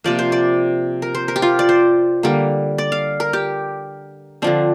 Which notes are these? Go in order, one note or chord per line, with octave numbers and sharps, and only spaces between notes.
C3 F3 A#3 D5
C5
D5
A#4
C5
A#4
G4
F4
D5
C5
D3 G3 A#3
D5
F5
A#4
G4
D3 F3 C4 D4